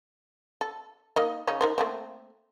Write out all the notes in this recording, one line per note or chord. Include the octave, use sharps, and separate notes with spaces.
A4
A#3 D#4 D#5
C#3 C#4 D#4
D#4 A#4 C5
A3 A#3 C4